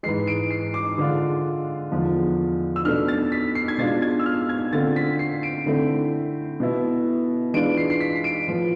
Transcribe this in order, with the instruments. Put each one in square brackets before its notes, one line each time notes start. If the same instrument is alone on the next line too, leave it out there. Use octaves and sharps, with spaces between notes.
[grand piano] G#2 E3 G#3 C7
D7
C7
D6
D3 G#3 D4 F4
E2 D3 F3 G#3 D4
E6
B2 A3 D4 F6
A6
B6
C7
G#6
B2 G#3 D4 F4 A6
G#6
E6
F6
G#6
D3 A3 C4 F4 A6
B6
C7
D7
D3 A3 C4 E4
B2 B3 E4
E3 G#3 D4 F4 D7
C7
C7
B6
D7
A2 F3 B3 F4